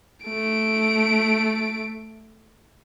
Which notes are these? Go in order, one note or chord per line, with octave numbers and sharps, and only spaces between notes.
A3 D7